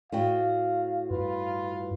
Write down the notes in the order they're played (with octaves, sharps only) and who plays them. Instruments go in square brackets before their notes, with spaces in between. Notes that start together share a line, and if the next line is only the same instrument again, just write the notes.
[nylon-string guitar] A2 F#4 G5 [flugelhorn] F5
[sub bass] G2 [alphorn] F4 [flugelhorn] B4